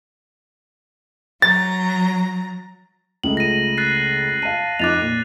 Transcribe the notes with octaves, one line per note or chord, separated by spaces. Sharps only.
F#3 A#5 A6
C#2 C#3 A3 F#7
A#6 D#7
F#6 A6 C7
F5 A5 D#7
F2 D#4 D6 F#6 A6 F7
A#2